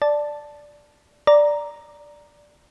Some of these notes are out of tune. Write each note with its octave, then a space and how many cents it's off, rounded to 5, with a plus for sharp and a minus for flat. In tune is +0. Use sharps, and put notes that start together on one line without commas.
D5 +0 A5 +0
D5 +0 A#5 +0